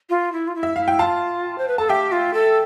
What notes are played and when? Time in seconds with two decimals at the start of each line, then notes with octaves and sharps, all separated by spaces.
0.10 F4
0.32 E4
0.48 F4
0.55 E4
0.63 E5
0.76 E4 F5
0.88 G5
0.99 F4 F5 A5
1.58 C5
1.68 B4
1.78 A4 A5
1.89 G4 E5 G5
2.12 F4
2.34 A4